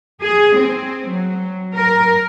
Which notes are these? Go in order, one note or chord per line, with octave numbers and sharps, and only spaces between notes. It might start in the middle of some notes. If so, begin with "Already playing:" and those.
G#4
C4
F#3
A#4